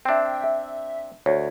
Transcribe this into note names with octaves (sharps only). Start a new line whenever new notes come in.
C4 D4 E5 G5
E5
D2 C#5